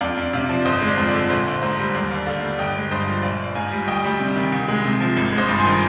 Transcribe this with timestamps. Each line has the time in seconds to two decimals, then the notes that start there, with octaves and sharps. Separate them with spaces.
0.01 F2 D5 F5
0.17 F2
0.33 C3 D5 F5
0.49 F3
0.65 G1 C5 D#5
0.81 G#3
0.87 D5
0.97 F2
1.09 D5
1.14 D3
1.30 A#1 C5
1.47 A#1
1.62 G#2 C5
1.79 G3
1.94 D#2 D5
2.11 D#2
2.26 D3 D5 F5
2.43 G3
2.59 G1 D#5 G5
2.75 G#3
2.91 G2 C5 D#5
3.07 F3
3.23 A#1 D5 F5
3.39 A#1
3.55 G#2 F5 G#5
3.71 G3
3.87 D2 D#5 G5
4.04 G3
4.20 C3
4.36 D#3
4.52 C2
4.68 G#3
4.84 C3
5.00 F3
5.17 G#1
5.32 G#3
5.38 C5 D#5
5.48 G2
5.59 G#5 C6
5.65 D#3